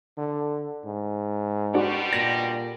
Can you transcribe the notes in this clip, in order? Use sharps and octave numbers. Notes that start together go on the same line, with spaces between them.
D3
G#2
B2 D3 G3 D4 F#4
A#2 A#6